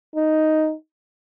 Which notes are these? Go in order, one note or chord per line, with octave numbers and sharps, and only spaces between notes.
D#4